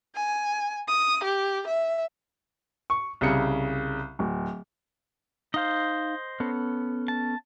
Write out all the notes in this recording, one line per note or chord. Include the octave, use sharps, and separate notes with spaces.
G#5
D#6
G4
E5
C#6
C2 C#3 C#7
D1
D#4 C5 D#5 F5
B3 C#4 A4
A5